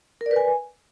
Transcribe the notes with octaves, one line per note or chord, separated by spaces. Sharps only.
A#4
D5
B4
G#5